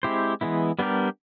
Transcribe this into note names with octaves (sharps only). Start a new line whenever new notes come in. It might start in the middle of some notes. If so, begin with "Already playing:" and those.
G#3 C4 E4 G4 C5
E3 G#3 B3 E4
G3 B3 D4 G4 A#4